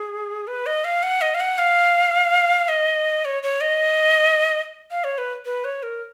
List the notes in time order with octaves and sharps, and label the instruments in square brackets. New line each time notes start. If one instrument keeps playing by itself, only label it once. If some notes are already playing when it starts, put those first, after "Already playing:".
Already playing: [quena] G#4
B4
D#5
F5
F#5
D#5
F5
F#5
F5
D#5
C#5
C#5
D#5
F5
C#5
B4
B4
C#5
A#4